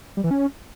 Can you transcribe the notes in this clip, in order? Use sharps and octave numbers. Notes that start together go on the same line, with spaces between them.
G3
E3
C#4